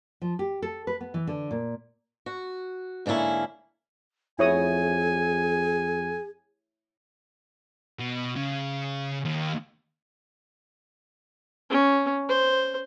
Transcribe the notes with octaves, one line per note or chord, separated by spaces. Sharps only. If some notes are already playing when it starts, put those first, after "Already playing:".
F3
G4
A4
B4
B3
E3
D3
A#2
F#4
G#2 D3 A#3 C#4 E4
F2 E4 G#4 C#5 G#5 D#6
B2
C#3
D#2
C#4
C5